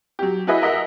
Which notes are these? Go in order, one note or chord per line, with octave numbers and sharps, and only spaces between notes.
F#3 G4
E4 F#4 G#4 B4 D#5 E5
A#4 D#5 E5 F#5